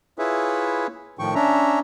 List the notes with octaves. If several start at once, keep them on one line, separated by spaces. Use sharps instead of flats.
E4 F4 G#4 B4 C#5 E5
A2 D#3 F3 G5 C#6
C#4 D4 E5 A#5